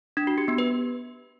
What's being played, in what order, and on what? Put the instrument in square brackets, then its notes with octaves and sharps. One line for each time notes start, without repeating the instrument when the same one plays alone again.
[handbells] D4
F#4
G4
B3
B4